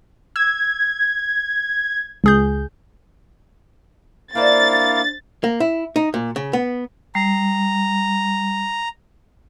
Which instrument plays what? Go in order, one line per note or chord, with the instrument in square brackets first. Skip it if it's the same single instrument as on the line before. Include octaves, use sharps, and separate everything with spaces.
[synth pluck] E6 [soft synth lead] G#6
[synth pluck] C#2 G#4 G6
[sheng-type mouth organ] A#3 E4 F5 [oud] D4 C5 D5 [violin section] A6
[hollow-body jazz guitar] A#3
E4
D#4
A#2
C#3
B3
[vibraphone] G3 [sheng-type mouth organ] A#5